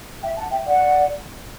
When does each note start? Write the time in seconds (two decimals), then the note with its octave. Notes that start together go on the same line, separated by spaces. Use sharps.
0.23 E5 G5
0.37 F#5 A5
0.51 E5 G5
0.65 D5 F#5